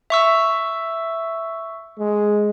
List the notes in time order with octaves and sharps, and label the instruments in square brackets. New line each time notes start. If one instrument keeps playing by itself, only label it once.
[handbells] E5 C#6 E6
[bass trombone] G#3